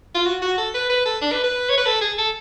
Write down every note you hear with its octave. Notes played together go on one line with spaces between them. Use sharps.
F4
F#4
F#4
A4
B4
B4
A4
D4
B4
B4
C#5
B4
A4
G#4
A4